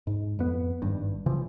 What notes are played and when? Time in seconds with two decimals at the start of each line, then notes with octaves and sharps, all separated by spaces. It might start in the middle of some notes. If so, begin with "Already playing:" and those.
0.07 G#2
0.39 F2 B3
0.82 G#1 G2
1.26 C#3 E3 F3